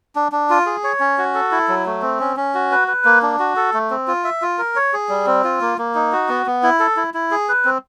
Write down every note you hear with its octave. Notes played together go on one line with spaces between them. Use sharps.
D4
D4
F4
G#4
C#5
C#4
F#4
A4
E4
F#3
A3
C4
C#4
C#4
F#4
B4
B4
A#3
D4
F#4
A4
A3
C4
F4
E5
F4
A#4
C#5
G#4
G3
C4
F4
A#3
A#3
D#4
F#4
B3
B3
E4
A4
E4
E4
G#4
B4
C4